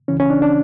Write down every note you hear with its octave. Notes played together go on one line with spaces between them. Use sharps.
C#2 C#3 E3 C#4
C#4
D4
D4